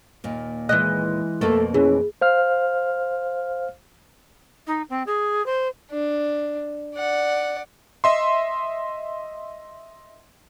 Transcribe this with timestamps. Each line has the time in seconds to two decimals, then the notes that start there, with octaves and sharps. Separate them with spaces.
0.24 D#2 A#2
0.69 E3 G#3 D#5 F#6
1.41 F2 B2 A3 A#3 A4
1.74 E3 C#4 G#4
2.21 C5 F5 F6
4.67 D#4
4.89 C4
5.06 G#4
5.46 C5
5.91 D4
6.96 D5 F#5
8.04 D#5 E5 C6